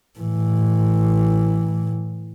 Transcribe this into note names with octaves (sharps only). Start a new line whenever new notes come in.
A2 E3